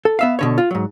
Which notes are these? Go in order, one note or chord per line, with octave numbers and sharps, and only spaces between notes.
A4
B3 E5 F5
B2 D3 C#5
F4
G#2 F#3